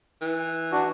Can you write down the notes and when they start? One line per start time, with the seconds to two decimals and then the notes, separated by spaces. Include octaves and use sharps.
0.21 E3
0.72 D4 F#4